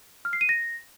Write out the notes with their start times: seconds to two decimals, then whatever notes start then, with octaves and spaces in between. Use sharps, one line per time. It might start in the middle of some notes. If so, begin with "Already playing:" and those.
0.25 F6
0.33 C7
0.41 D#7
0.49 A#6